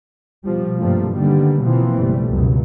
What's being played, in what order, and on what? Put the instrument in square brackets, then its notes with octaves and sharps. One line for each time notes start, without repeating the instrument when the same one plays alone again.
[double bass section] B2 F3 G3
G2 C3 F3 G3 A3 A#3
D3 D#3 G3 A#3 B3
B2 E3 F3 A#3 C4
F#1 B2 G3 A3
C#2 F#2 B2